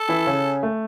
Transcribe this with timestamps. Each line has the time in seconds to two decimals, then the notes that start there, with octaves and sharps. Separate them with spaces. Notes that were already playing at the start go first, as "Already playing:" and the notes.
Already playing: A4
0.09 E3 E4
0.27 C#3 C#4
0.63 A3